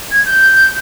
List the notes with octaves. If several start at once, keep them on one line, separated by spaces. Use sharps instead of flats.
G#6
G6